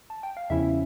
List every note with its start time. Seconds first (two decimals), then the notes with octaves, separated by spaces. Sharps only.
0.10 A5
0.23 G5
0.37 F5
0.50 E2 C#3 F3 C#4 E4 E5